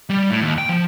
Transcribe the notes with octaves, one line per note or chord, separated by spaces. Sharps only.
G3
A2
D#2
G5
F3